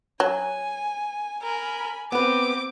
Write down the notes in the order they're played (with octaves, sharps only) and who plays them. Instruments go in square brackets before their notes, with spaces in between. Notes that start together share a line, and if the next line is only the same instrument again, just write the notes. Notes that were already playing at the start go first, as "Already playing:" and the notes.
[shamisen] F#3 [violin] G#5
[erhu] A#4 [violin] G#5 B5
[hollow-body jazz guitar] B3 B4 [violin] C4 G4 [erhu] D6